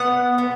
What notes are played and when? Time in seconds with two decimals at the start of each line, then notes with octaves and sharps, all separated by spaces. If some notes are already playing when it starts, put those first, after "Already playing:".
Already playing: B3 F#5
0.38 B3